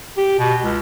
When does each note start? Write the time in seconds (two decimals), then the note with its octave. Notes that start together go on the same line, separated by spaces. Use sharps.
0.17 G4
0.39 B2
0.62 C#2